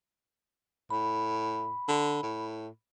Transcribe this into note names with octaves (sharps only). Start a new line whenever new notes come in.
A2 B5
D3
A2